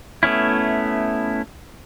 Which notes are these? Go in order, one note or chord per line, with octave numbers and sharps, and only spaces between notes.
A3 B3 C#4 E4